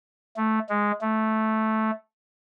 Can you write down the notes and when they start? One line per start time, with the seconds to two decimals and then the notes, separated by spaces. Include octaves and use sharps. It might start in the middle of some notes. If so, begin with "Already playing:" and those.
0.37 A3
0.69 G#3
1.01 A3